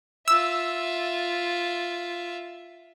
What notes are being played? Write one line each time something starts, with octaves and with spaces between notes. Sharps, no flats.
F4 E5 E6